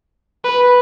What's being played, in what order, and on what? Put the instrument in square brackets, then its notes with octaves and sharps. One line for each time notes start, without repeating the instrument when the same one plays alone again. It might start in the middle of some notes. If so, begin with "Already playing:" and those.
[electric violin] B4